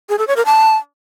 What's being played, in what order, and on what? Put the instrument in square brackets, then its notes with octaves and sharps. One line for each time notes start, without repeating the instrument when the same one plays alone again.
[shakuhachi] G#4
A4
C#5
A#4
A5